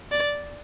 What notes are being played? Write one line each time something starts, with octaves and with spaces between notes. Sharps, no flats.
D5